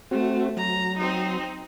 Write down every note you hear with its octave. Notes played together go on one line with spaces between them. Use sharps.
A3 C4 F#4
F#3 A#5
C4 D#4